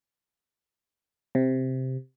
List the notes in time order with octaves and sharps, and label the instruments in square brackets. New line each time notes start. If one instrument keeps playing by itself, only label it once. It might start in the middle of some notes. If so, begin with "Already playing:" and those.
[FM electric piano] C3